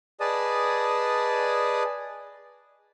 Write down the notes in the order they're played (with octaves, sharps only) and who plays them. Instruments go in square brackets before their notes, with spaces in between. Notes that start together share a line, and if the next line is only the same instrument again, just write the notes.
[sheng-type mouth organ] G#4 B4 D5 D#5 A5 D#6